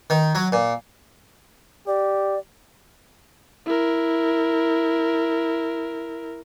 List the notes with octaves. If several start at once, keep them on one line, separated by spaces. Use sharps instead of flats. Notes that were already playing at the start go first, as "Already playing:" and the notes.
D#3
F#3
A#2
G4 D5
E4 A#4